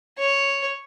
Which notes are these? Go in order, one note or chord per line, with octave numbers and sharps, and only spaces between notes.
C#5